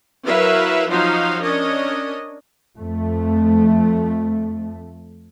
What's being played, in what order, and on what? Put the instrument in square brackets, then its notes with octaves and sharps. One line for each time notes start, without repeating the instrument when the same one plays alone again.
[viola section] F#3 E4 A#4 B4 E5 F5
F3 F#3 D#4 F#4 C5 F5
C#4 D4 A#4 C#5 D#5
[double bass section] F2 A3